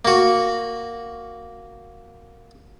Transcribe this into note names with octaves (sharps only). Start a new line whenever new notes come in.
A#3 F#4